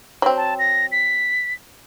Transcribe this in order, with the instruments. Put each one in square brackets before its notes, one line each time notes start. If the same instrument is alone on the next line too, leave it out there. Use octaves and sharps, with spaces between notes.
[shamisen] F#3 C4
[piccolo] A5
A#6
B6